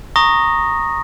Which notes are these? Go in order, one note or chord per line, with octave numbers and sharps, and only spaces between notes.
A#5 C#6 D#6 A#6